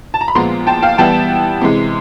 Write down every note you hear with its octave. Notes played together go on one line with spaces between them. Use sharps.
A5
A#5
B5
A#2 F3 G#3 B3 A#5 C6
G5 A5
F5 G5
E3 G3 B3 E4 G5 A5
C3 E3 G#3